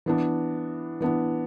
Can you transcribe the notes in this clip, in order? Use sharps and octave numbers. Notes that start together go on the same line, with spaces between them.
E3 B3 D4
E3 B3 D4